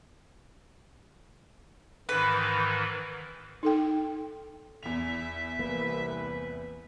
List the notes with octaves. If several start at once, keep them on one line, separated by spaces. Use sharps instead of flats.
G#2 D#3 E3 B4
D#4 A4 G5
E2 E5 F7
C2 E3 A#3 B4